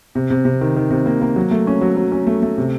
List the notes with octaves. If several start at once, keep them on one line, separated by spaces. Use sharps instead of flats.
C3
C3
C3
D#3
D#3
C3
A#3
A#3
F#3
A3
C#4
F#3
F#3
C#4
A3
A3
C3